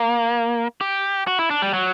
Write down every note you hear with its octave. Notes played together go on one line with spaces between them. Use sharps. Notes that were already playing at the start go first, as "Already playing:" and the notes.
Already playing: A#3
G4
F#4
E4
D4
G3
F#3